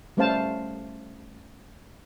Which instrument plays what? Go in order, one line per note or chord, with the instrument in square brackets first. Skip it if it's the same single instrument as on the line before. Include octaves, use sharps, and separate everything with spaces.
[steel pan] G3 A3 C#4 C5 F5 A5